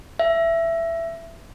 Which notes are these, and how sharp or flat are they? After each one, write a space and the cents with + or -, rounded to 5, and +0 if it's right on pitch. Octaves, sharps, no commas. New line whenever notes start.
E5 +15